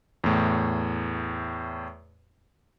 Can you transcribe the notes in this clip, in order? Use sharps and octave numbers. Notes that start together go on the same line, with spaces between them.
E2 A2